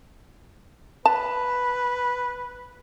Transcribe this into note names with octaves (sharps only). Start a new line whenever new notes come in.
B4 A5